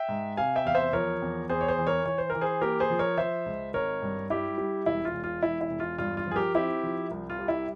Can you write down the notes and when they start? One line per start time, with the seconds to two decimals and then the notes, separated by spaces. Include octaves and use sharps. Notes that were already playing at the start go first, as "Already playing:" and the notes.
Already playing: E5 G5
0.09 G#2
0.37 C3 F5 G#5
0.56 E5 G5
0.65 E2 F5
0.75 C5 E5
0.93 F3 A#4 C#5
1.22 E2
1.49 E2 G#4 C5
1.61 C#5
1.68 G#4 C5
1.78 E3
1.87 A#4 C#5
2.05 E3 C#5
2.18 C5
2.30 E3 A#4
2.41 G#4 C5
2.61 A#3 G4 A#4
2.80 G#4 C5
2.90 F3
2.99 A#4 C#5
3.18 F3 C5 E5
3.46 C#2
3.74 G#1 A#4 C#5
4.02 G2
4.30 G3 E4 G4
4.58 G3
4.86 E1 E4
5.05 F4
5.14 E1
5.24 F4
5.43 E1 E4
5.61 E4
5.71 E1
5.80 F4
5.98 G2 F4
6.17 F4
6.27 F3 G#4
6.36 G4 A#4
6.54 C4 E4 G4
6.83 F3
7.11 C2
7.30 F4
7.39 G3
7.48 E4